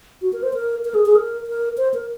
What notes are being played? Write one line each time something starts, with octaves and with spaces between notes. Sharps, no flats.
F#4
A#4
C5
A#4
A#4
G#4
G#4
A#4
A#4
C5
A#4